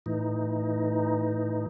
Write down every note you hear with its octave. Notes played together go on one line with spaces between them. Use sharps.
A2 E3 D#4